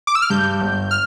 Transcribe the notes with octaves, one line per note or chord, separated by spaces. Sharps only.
D6
E6
F6
G2 G6
G1
F6